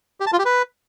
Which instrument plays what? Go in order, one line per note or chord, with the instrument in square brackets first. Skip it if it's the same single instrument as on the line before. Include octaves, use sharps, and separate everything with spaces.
[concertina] G4
A5
F4
G4
B4